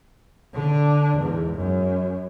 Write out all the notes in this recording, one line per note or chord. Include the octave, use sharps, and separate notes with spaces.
D3 D4
E2 G#2
F#2